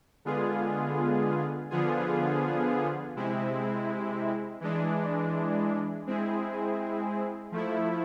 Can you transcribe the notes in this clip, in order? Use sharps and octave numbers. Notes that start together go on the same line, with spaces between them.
D3 G#3 B3 F4 G#4
D3 F3 B3 F4 G#4
C3 G#3 C4 E4
E3 G#3 D4
G#3 C4 E4 G#4
F3 A3 E4